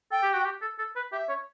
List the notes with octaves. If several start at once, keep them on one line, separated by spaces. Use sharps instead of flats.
A4 G5
G4
F#4
G4
A4
A4
B4
G4 E5
C#5